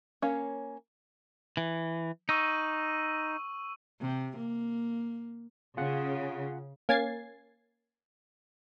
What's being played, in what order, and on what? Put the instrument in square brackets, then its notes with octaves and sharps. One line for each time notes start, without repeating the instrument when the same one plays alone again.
[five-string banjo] A#3 C#4 C#5 F5
[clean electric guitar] E3
[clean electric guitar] D#4 [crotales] C#6 E6 D#7
[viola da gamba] C3
A#3
[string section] C#3 [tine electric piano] F4 G#4 F#5
[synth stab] A#3 C#4 G#5 G#6 A6 C7